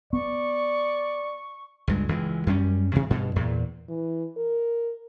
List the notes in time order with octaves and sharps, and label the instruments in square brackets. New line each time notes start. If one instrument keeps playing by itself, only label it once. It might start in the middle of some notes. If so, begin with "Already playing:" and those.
[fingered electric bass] B3 [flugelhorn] D5 [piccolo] C#6
[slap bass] C#2 G2 G#3
C#2 E3 G3 G#3
F#2 G3 C#4
A2 C3 D#3 E3
G2 B2
E2 A#2
[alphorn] E3
A#4